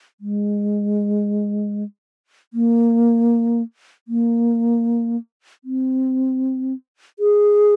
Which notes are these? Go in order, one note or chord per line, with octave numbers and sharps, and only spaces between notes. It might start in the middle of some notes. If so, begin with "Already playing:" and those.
G#3
A#3
A#3
C4
G#4